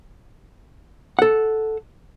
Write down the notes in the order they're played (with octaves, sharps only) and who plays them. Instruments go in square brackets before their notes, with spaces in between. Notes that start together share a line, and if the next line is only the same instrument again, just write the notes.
[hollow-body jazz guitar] A4 F#5